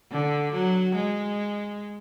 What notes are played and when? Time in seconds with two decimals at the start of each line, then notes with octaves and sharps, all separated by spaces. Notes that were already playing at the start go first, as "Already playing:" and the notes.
0.12 D3
0.53 F#3
0.95 G#3